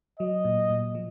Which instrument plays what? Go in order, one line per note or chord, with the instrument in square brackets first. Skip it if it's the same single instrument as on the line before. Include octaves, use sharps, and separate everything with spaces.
[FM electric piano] F#3 [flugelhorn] D#5
[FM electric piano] A#2
A#2
F3